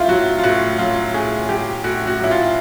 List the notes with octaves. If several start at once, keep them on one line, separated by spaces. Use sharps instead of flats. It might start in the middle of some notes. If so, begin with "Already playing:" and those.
Already playing: A2 E4 F4
F#3 F#4
F4
A2 F#4
F#3 F4
A2 G#4
F#3 G4
A2 F#4
F#4
F#3 E4
F4